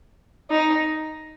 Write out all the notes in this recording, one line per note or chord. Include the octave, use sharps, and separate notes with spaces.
D#4